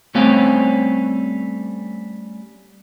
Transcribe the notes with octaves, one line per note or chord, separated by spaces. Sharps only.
G3 A3 C4 C#4 G4 F5